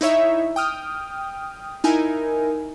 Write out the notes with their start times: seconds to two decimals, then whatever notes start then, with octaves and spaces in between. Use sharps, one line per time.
0.01 D#4 E4 C#5 E5
0.56 G5 D#6 F6
1.84 D#4 E4 A#4 G#5